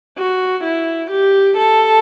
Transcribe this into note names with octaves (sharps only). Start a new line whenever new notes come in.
F#4
E4
G4
A4